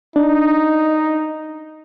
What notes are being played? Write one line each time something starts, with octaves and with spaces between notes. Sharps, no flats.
D4 D#4